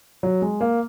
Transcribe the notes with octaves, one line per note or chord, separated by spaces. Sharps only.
F#3
G#3
A#3